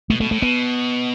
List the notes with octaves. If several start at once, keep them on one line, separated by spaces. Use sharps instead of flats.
B2 A3
B2 A3
A2 A3
B2 B3